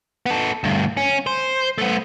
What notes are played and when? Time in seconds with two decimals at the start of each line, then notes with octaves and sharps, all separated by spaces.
0.26 B3 A4
0.64 D2 G2
0.97 C#4
1.27 C5
1.78 A3 B3